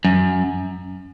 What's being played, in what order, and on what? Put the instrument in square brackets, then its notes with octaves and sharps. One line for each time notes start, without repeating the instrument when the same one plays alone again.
[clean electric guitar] F#2